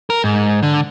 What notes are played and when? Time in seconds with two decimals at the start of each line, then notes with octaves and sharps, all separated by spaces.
0.10 A#4
0.24 G#2
0.63 D3